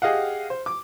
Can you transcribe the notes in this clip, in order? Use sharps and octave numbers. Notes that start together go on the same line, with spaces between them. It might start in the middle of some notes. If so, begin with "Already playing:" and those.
G4 G#4 D#5 F5 F#5
C5
D6